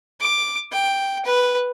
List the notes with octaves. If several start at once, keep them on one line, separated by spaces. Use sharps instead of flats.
D6
G5
B4